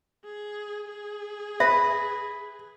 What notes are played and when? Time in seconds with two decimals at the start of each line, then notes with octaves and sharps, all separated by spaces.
0.24 G#4
0.88 G#4
1.60 B4 E5